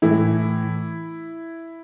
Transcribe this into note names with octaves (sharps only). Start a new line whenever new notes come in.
A2 E3 E4